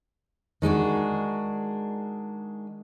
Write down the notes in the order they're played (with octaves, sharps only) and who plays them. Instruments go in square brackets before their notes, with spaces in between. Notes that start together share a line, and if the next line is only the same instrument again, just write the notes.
[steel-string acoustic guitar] D#3 G#3 D4 F#4